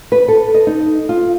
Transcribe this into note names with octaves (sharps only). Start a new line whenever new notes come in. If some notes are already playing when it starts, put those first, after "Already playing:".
B4
A4
D#5
D#4
F4